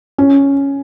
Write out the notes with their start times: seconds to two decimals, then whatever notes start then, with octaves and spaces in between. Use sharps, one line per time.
0.18 C#4